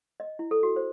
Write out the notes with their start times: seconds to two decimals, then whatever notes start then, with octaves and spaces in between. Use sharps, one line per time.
0.20 D#5
0.39 E4
0.51 A4
0.63 F#4
0.76 C5